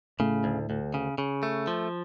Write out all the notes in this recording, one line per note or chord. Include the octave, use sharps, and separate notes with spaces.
A2 C#3 A3
D2
D2
C#3
C#3
A3
F3